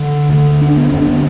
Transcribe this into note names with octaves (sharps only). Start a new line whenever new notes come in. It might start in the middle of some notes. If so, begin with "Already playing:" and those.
Already playing: D3
D2 D3
D4
B3
F#2 D3 D4
B3